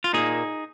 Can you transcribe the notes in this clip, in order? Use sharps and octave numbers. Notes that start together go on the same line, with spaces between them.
F4
A#2 A#3 D#4 G#4